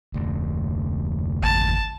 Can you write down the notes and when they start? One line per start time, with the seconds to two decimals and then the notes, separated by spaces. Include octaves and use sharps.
0.14 F1 D2
1.43 G#1 A5